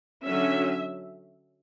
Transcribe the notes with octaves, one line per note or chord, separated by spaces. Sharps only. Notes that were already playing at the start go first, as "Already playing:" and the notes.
D3 F#3 C#4 E5